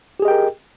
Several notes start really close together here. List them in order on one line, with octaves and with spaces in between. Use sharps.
G4 G#4 D#5 G5 A#4